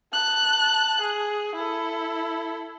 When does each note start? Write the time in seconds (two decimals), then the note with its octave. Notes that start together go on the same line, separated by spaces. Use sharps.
0.13 A5 F#6
1.00 G#4
1.55 E4 A4